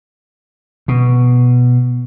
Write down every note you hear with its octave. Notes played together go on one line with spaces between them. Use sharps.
B2